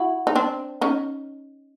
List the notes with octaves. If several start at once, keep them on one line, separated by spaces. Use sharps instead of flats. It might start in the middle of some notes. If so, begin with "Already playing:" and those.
Already playing: E4 F#4
D#4
C4 D4
C#4 D#4